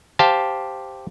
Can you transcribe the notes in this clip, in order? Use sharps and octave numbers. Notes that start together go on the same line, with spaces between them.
G4 C5 F5 A5